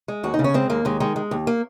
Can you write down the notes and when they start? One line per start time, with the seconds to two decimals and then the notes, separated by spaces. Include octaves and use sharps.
0.08 G#3
0.23 D#2 F#4
0.34 D#4
0.39 C#3
0.44 C#4
0.54 G#3 C4
0.70 D#2 A#3
0.85 D#2 G#3
1.00 D#3 G#3
1.16 G#3
1.31 D#2
1.47 A#3